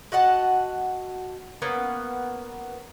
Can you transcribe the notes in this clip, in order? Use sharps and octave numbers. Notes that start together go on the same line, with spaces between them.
F#4 D#5 F#5 A5
A#3 B3 C#4